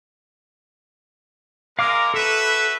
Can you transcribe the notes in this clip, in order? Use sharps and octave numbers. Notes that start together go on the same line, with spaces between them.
G#3 A#4 F5 D6 F6
F#4 A4 B4 E5